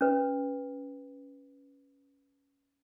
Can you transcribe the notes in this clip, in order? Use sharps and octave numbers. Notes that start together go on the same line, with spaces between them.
C#4 B4